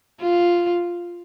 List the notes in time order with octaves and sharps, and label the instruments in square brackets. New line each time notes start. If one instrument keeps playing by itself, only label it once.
[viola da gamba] F4